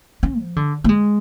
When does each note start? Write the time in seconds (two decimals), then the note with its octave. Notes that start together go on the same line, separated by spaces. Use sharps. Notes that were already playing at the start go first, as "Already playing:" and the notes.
0.23 C#4
0.40 F3
0.56 D3
0.84 A3
0.89 G#3